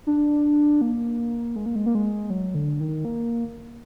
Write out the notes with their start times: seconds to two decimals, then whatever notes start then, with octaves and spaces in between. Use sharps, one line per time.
0.07 D4
0.81 A#3
1.56 G#3
1.66 A#3
1.76 G#3
1.86 A#3
1.95 G#3
2.30 F#3
2.55 D3
2.80 D#3
3.05 A#3